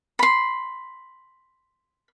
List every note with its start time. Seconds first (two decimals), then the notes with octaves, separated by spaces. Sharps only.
0.19 B5 C6